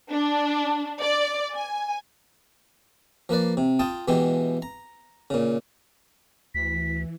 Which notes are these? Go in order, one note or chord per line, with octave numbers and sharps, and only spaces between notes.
D4
D5
G#5
F3 A#3 B4 D5
C3
F4 G5 A5 D#6
B2 E3 G#3 E4 G4
A#5
A#2 C#3
D2 E3 B6